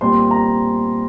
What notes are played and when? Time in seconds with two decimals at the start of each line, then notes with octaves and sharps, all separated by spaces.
0.01 A#2 G3 C4 C6
0.31 A#5